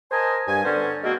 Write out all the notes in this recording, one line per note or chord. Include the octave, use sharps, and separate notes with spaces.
A#4 C5 D#5 G#5 A5
G2 G#5
D3 B3 C#4 C5 D5
B2 G#3 A#3 C4 F#4